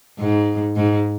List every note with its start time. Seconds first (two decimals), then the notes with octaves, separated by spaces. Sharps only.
0.19 G#2
0.76 G#2